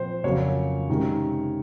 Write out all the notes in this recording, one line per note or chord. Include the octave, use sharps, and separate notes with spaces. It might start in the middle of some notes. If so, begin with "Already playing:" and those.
Already playing: A#2 F3 C4 C5
F2 C#3 F#3 A#3 C#4 C#5
C3 D#3 G#3 C#4